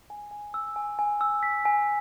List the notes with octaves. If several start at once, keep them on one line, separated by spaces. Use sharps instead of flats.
G#5
G#5
E6
G#5
G#5
E6
B6
G#5